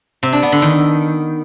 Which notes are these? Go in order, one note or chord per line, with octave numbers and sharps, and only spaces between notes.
C3
D4
B3
D3
D#3